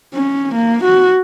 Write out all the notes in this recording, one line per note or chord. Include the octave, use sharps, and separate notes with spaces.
C#4
A#3
F#4